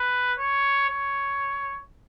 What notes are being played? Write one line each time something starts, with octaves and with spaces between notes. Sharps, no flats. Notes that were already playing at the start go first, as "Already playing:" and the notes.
Already playing: B4
C#5
C#5